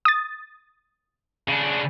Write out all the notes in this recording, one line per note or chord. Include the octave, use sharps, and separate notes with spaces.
D#6 A6
C#3 D4